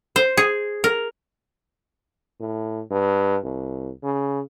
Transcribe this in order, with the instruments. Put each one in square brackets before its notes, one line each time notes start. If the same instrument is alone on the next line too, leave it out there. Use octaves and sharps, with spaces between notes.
[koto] C5
G#4
A#4
[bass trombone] A2
G2
C2
C#3